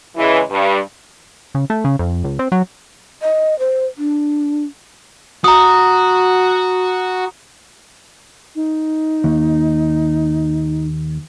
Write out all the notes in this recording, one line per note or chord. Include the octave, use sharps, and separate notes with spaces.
C#3 E3 G#3
G2
C#3
A3
C#3
F2
C#2
C4
F#3
D#5
C5
D4
F#4 A#5 D#6
D#4
D#2